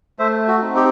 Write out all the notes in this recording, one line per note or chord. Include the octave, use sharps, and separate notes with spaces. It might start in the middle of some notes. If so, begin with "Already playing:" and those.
A3 C5 E5
F#4
C4 D#4
G4